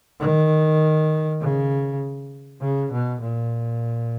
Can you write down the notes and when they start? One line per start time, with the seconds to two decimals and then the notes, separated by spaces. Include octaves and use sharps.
0.20 D#3
1.40 C#3
2.61 C#3
2.91 B2
3.20 A#2